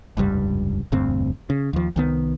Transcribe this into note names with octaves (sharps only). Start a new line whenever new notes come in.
F1 C#2 G2 G3
E1 D2 G2 C4
C#3
D#2 F3
C2 D#3 B3